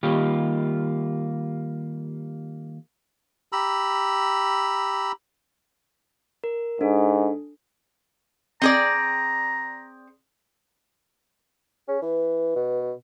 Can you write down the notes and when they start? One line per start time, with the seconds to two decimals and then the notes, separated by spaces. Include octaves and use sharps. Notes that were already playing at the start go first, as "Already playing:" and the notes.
0.03 D#3 G3 A#3 F4 G4
3.52 G4 A#5 B5 E6
6.44 A#4
6.81 G#2 D4 A4
8.62 C4 G#4 D5 A#5
11.88 C#4 G#4
12.02 E3 B4
12.55 B2